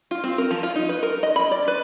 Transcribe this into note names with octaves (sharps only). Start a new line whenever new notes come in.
F4
C4
A#4
F3
F4
D#4
B4
A#4
D#5
B5
D5
B4